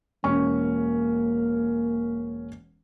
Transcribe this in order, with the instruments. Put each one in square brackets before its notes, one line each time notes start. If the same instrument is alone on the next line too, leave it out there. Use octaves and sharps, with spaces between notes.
[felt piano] E1 C#4 C#6 [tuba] A#3